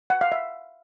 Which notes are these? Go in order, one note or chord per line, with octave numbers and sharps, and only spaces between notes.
F#5
F5
E5